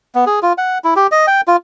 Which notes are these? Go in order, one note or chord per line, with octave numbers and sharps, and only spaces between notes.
B3
G#4
F4
F#5
E4
G4
D#5
G5
F4